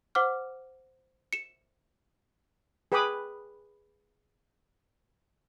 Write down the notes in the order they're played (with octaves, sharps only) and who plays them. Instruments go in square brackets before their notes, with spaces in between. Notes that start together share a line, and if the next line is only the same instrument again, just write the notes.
[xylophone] C5 F#5 D6 F6
C#7 E7
[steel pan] G#4 B4 G5 B5 D6 D#6